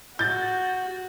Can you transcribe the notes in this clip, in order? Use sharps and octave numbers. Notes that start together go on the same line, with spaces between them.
F#4 G6 A6